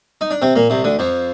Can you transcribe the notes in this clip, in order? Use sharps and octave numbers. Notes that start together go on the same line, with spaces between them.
D#4
D4
C3 C4
A#2 A#3
C2 C3
D2 D3
F2 F3